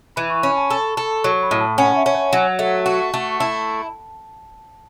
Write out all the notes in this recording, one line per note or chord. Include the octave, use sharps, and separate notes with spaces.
E3 B5
C#6
C#4 B5
A5
A4 A5
A4
F#3 C#6
B5
A2
A5
C#4 F#5
E5
C#4
C#5
F#3 F#5
A3
F#4
A3
E4 A5